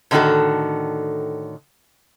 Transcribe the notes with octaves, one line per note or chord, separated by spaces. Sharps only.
A2 D3 D#3 A3 F#4 A4